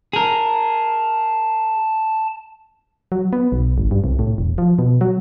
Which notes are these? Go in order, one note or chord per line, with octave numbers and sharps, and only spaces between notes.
G#4 A#4 A5
F#3
B3
B1
G#1
G2
C2
A2
E1
F3
B2
F#3